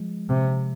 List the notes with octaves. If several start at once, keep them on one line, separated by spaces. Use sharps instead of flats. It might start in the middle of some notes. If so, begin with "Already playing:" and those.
Already playing: F3 G#3
C3